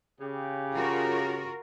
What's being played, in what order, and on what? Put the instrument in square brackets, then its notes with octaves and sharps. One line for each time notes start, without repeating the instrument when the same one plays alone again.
[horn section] C#3 G4
[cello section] F4 F#4 A#4